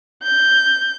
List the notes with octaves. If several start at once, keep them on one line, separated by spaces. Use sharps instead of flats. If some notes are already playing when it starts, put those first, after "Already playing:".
G6